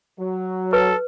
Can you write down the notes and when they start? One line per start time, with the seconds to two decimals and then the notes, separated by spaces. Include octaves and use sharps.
0.19 F#3
0.73 A4 B4